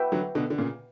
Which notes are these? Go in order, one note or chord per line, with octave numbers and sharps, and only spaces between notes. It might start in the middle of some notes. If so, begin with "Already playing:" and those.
Already playing: F#4 B4 E5 G5
D3 F#3
B2 D3
D3
A#2 C#3